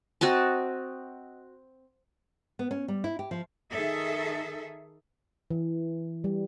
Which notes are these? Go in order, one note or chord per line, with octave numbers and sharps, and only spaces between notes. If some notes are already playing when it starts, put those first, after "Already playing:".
C4 F#4 D#5 A5
B3
C#4
G3
E4
G4
F3
D#3 G#4 A4 E5
E3
G3